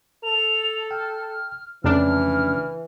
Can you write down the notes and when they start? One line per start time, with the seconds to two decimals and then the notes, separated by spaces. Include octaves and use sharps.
0.24 A4 F7
0.91 G5 F6
1.84 F2 C#3 E3 A3 C#4 D4 F6